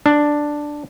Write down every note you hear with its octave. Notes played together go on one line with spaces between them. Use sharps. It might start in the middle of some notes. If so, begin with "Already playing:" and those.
D4